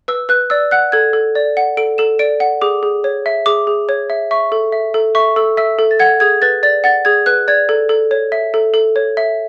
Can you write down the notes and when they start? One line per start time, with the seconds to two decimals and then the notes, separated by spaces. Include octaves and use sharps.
0.08 B4 E6
0.29 B4 F#6
0.50 D5 E6
0.71 F#5 F#6
0.92 A4 G#6
1.13 A4
1.35 D5
1.57 F#5
1.77 A4 D7
1.98 A4 E7
2.19 D5 D7
2.40 F#5 C#7
2.61 G#4 D6
2.83 G#4
3.04 C#5
3.26 E5
3.46 G#4 D6
3.67 G#4
3.89 C#5
4.10 E5
4.31 E5 C#6
4.52 A4
4.72 E5
4.94 A4
5.15 E5 C#6
5.36 A4 E6
5.57 E5 E6
5.79 A4
5.91 A6
5.99 F#5 G#6
6.20 G#4 G#6
6.42 B4 A6
6.63 D5 A6
6.84 F#5 A6
7.05 G#4 G#6
7.26 B4 F#6
7.48 D5 G#6
7.69 A4
7.89 A4
8.11 C#5
8.32 E5
8.54 A4
8.74 A4
8.96 C#5
9.17 E5